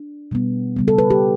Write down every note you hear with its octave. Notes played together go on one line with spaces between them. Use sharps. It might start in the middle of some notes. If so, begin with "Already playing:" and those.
Already playing: D4
B2 G3 B3
C#3 G3 B3
A4
B4
G4